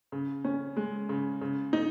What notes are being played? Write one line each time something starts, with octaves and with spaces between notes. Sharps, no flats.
C#3
C#4
G#3
C#3
C#3
D#4